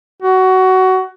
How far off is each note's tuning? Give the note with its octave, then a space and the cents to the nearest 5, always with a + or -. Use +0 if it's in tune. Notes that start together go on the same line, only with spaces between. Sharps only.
F#4 +20